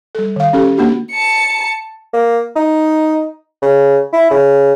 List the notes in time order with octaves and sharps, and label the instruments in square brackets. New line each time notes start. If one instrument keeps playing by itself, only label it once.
[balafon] G3 A4
D#3 F5
C#4 G4 A4
A#3 D4 F#4 G4
[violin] A5 C#7
[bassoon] A#3
D#4
C#3
E4
C#3